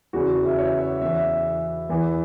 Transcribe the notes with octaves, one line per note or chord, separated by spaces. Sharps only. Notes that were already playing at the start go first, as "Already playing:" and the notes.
E2 C#3 E3 F#4
E5
C#5
E5
E2 E3 E5
E2 E3